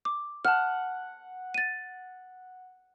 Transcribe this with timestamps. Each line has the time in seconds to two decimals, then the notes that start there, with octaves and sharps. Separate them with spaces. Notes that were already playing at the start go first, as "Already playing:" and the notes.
0.05 D6
0.45 F#5 A5 F6
1.54 A6 D#7